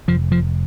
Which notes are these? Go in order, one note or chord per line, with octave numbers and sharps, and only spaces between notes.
F1 F3
F3